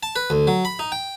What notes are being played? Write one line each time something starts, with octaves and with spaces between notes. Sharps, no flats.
A5
B4
D2
F#3
B5
D#4
G5